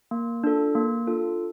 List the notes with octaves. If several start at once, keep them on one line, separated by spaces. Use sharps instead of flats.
A#3
D4 F4 A4
A#3
D4 F4 A4